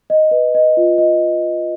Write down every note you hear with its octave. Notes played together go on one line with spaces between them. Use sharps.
D#5
B4
D#5
F4
D#5